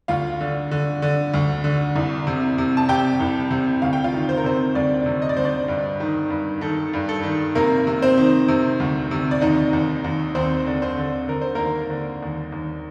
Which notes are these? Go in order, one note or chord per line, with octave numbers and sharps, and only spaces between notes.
D2 F4 F5
D3
D3
D3
D2
D3
C2
C3
C3
A5
C3 G4 G5
C2
C3
D2 F5
G5
F4 F5
D#3
C5
A#4
C3 C4 C5
D2 D4 D5
C3
D#5
D5
D2 C5
D4 D5
G2
D#3
G2
D#3 A4
G2
A4
D#3
C3 A#3 A#4
C3
C4 C5
D#3
C3
D2
C3
D5
D#2 D#4 D#5
D#2
D#2
D#2 C4 C5
D3
C4 C5
D3
D3 A#4
C5
D#2 A#3 A#4
D3
D#2
D#2